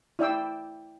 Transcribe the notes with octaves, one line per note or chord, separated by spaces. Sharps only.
E4 D5 G5 E6